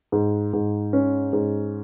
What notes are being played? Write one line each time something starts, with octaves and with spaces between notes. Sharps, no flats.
G#2
G#2
C#4
G#2